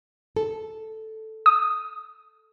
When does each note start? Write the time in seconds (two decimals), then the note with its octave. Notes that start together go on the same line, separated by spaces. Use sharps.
0.36 A4
1.46 D#6